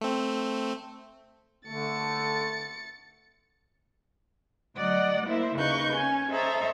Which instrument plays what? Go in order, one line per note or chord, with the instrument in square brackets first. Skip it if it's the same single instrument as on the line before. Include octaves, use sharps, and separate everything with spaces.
[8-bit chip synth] A3 C4
[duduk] D3 [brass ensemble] A3 [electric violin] A6 C#7
[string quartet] D2 F#3 D5 D#5 F#5
A#3 E4 C5 E5
D#2 C#3 D#4 B4 C#6 G6
C#4 G#5
A4 C5 C#5 D#5 E5 A#5